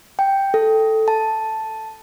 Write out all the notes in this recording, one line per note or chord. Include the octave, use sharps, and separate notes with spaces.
G5
A4
A5